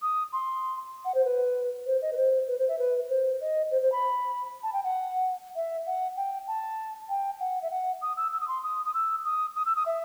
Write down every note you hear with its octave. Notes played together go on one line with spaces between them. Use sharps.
D#6
C6
F#5
C5
B4
C5
D#5
B4
C5
B4
C5
E5
B4
C5
D#5
C5
C5
B5
A5
G5
F#5
E5
F#5
G5
A5
G5
F#5
E5
F#5
D#6
E6
E6
D#6
C6
D#6
D#6
E6
D#6
D#6
E6
D#6
E5